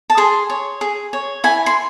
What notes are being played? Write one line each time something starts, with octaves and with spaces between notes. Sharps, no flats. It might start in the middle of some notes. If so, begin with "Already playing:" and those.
A5
G#4 C6
C#5
G#4
C#5
E4 G#5
C6